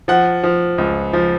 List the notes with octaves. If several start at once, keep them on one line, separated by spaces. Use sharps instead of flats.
F3 F#5
F3
C#2
F3